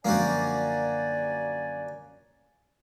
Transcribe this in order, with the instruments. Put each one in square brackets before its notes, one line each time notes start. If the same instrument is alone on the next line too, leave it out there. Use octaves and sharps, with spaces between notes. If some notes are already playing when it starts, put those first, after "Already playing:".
[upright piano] F#2 D3 F3 [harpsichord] A#3 F#4 G4 [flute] D5 [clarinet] G#5